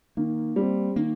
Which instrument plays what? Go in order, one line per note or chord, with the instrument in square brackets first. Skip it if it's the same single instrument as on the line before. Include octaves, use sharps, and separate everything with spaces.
[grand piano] D#3 [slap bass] A#3
[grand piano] G3 C4
[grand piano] D#3 [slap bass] A#3